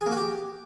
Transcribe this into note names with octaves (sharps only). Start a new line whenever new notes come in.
G#4
A#3
F#4
G4